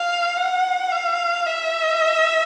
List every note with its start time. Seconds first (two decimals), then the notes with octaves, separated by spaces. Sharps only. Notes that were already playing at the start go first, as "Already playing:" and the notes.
Already playing: F5
0.37 F#5
0.92 F5
1.46 E5